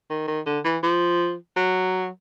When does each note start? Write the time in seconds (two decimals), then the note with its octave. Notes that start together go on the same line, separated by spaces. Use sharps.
0.10 D#3
0.28 D#3
0.46 D3
0.65 E3
0.83 F3
1.56 F#3